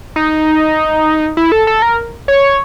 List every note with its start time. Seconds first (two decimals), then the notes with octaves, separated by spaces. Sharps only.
0.16 D#4
1.37 E4
1.52 A4
1.67 A4
1.82 A#4
2.28 C#5